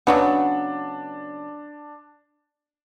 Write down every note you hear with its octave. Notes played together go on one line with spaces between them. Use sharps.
C#3 F#3 B3 D4